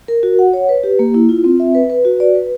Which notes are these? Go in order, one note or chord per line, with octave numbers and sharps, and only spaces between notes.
A#4
F#4
F#5
C#5
B4
G4
A#3
E4
F4
C4
E5
B4
B4
F#4
D5
B4